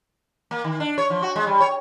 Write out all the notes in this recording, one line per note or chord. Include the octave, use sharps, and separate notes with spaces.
A#3
D#3
D4
C#5
F3
F#4
G#3
G3
C#5